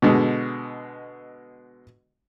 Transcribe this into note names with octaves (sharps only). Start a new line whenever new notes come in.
B2 D3 G#3